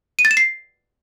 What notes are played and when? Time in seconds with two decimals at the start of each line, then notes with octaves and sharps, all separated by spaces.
0.19 D#7
0.25 A6
0.31 E7
0.37 C7